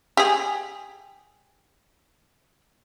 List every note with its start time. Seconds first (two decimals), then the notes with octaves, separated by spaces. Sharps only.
0.17 G4 G#4